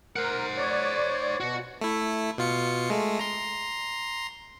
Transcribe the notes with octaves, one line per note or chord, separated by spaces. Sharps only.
A#4 C5 F#5
C#5 D5
B2 F#4
A3 E4
B2 F4 C#7
G#3 A3
A#5 C6